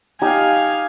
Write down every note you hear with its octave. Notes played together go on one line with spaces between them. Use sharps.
D#4 G4 F5 G#5